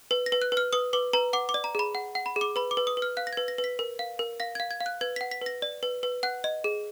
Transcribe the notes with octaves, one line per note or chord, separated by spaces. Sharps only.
B4
A#6
B4
F#6
B4
F6
B4 D#6
B4 D6
B4 A#5
F#5 D6
D6
D5
A#5
G#4 B5
F#5
F#5
B5
G#4
D6
B4 B5
D6
B4
D#6
B4
F6
F5 F#6
A#6
B4 G#6
A#6
B4
B6
A#4
F5
A#4
F5 A#6
F5 G#6
G#6
F5
F#6
B4 G#6
F#5 B6
B6
B4 A#6
D5
B4
B4
F#5 F#6
D#5
G#4